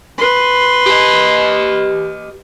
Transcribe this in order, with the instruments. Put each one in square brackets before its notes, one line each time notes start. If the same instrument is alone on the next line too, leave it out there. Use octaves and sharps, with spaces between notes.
[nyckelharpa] B4 C6
[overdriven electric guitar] G4 D#5